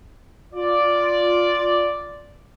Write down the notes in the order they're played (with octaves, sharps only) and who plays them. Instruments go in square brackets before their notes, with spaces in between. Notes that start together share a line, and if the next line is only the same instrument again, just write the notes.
[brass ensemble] F4 D5